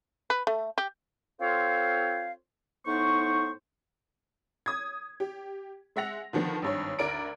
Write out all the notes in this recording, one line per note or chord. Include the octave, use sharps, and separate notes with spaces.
B4
A3
G4
C4 F4 A4 C5 C#5 F5
A2 B3 D#4 C5 C#6
D#6 G#6
G4
G#3 E5 F#5 A#6 F7
D3 D#3 F3 B3
G#1 G2 C#5
D2 A#4 D5 A#5 D7